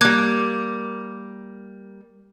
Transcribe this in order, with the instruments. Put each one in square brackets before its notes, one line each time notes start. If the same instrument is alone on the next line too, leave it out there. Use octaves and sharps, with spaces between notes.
[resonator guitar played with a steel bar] G3 A#3 [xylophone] D6 F#6 G#6